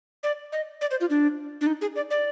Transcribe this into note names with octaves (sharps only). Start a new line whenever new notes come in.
D5
D#5
D5
C5
F4
D4
D4
D#4
G#4
D5
D5